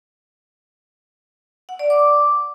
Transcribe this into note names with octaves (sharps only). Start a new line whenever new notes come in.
F#5
D5
D6